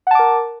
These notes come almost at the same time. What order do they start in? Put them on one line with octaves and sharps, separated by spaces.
F#5 A5 D6 A#4